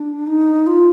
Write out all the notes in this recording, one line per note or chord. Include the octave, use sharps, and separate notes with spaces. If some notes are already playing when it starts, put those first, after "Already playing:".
Already playing: D4
D#4
F4